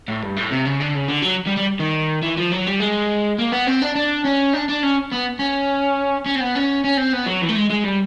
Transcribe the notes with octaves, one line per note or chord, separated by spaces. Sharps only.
A2
G2
A2
C3
C#3
D3
C#3
D3
F#3
G3
G3
D#3
E3
F3
F#3
G3
G#3
A#3
B3
C4
D4
D4
C#4
D4
D4
C#4
B3
C#4
C#4
C4
B3
C#4
C#4
C4
B3
F#3
E3
A3
G#3
G#3
G3